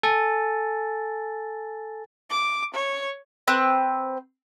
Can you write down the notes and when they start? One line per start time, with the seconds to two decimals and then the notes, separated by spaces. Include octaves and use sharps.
0.03 A4 G#5 A6
2.30 D6
2.74 C#5
3.48 C4 B4 F#6